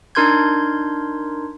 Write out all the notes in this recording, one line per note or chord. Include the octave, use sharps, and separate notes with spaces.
D4 D#4 A#4 C6 G6 G#6